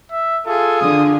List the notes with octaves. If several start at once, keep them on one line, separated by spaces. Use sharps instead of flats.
E5
F4 G#4 A4
D3 D#6